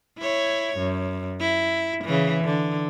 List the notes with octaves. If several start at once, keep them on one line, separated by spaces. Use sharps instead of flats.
E4 C#5
F#2
E4
C#3 E3
D3